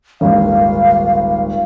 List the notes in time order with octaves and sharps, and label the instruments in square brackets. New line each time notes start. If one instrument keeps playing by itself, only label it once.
[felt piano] D#1 G#1 [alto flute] F5